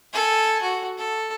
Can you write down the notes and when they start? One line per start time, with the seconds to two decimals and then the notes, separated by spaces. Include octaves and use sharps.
0.14 A4 G#5
0.62 F#4
0.98 A4